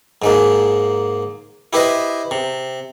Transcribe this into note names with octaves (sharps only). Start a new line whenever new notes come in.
G#2 G#3 A#3
E4 G4 B4 C5 D#5 E5
C3